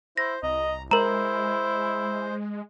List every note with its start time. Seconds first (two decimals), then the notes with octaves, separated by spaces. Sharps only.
0.18 E4 C5 A#6
0.43 C2 D#5 A#5
0.91 G#3 E4 A#4 C5 A#5